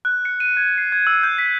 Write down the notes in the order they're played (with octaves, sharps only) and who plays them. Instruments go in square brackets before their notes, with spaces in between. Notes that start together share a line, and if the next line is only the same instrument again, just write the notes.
[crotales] F#6
C#7
D#7
G#6
C7
G#6
E6
G6
B6